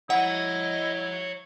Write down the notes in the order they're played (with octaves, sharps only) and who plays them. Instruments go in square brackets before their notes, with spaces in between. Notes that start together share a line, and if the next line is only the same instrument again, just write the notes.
[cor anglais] E4 [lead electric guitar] C#5 A#5 [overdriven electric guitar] D#5 [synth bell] F#5